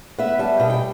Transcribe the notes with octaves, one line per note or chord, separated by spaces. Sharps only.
B3 E5
G3 A5
B2 G5
G5